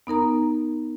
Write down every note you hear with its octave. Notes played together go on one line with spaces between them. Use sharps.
B3 D#4 A#4 A#5